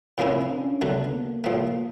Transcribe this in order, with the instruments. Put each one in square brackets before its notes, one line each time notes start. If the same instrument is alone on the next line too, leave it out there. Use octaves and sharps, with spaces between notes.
[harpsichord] A2 F3 A#3 C#4 E4 [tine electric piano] C4
[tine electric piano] C4
D4
C#4
[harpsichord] D3 F#3 A3 D4 [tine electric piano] B3
[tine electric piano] B3
A#3
[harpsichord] A2 F3 A3 [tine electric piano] A#3